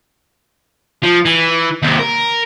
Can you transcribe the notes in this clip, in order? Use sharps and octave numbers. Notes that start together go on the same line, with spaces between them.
F3
E3
D#2 C3
A#4